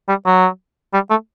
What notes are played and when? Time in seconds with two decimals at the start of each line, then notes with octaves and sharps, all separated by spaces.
0.08 G3
0.26 F#3
0.93 G3
1.10 A3